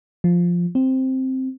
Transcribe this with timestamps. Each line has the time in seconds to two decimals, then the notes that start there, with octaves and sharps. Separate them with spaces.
0.24 F3
0.75 C4